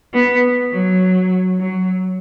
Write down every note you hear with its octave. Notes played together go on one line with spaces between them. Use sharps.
B3
F#3
F#3